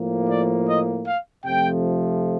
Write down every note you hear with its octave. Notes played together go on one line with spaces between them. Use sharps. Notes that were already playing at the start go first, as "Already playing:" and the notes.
Already playing: A2 F3 A#3
D5
D#5
F5
F2 C3 F3 A3 G5